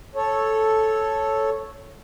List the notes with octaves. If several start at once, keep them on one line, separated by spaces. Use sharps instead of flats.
A4 C#5